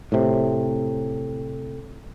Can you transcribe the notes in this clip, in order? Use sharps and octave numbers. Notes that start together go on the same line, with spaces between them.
A2 C3